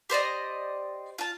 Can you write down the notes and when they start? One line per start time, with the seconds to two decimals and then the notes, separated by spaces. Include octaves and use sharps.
0.10 G4 C5 D5 D#5
1.18 F4 A5